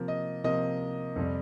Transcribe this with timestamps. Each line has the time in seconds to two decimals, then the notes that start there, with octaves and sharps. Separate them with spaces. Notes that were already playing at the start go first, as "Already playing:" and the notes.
Already playing: C3 F3 A#3
0.08 D#5
0.44 C3 F3 A#3 D#5
1.16 F2 C3 G3